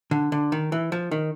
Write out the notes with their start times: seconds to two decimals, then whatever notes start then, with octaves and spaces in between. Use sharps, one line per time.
0.11 D3
0.32 D3
0.52 D#3
0.72 E3
0.92 F3
1.11 D#3